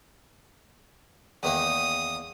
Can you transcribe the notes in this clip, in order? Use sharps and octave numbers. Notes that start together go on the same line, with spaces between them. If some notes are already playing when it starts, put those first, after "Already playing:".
E2 D#3 A#3 D#6